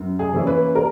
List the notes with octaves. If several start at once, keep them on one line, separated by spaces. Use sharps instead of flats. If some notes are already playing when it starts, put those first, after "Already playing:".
Already playing: F#2
G#4
E3 A#3 C#4 E4
B4
A#4